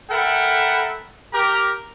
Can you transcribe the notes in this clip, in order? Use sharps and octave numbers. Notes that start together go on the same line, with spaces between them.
A4 A#4 E5 F#5 G5 B5
G4 A#4 A#5